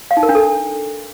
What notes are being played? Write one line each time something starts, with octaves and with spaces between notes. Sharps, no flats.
F5
D#4
A#4
D4
A4